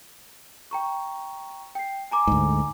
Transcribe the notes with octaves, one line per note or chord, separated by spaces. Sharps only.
G5 A#5 C#6
G5 C7
G#5 A#5 D6
D2 G#2